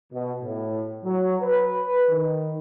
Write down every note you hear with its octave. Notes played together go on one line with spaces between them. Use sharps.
B2
A2
F#3
B4
D#3